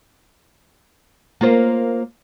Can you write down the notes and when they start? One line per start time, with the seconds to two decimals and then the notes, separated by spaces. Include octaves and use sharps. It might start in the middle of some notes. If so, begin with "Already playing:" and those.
1.41 A#3 F4 C5